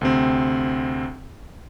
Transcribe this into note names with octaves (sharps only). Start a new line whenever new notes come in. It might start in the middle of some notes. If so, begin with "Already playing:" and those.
D2 C3 C4